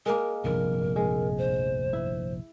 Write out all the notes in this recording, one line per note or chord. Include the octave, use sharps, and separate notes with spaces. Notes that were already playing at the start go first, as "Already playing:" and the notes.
G#3 A#3 A#4
F1 A#1 G2 A#4
G#3
C5
E4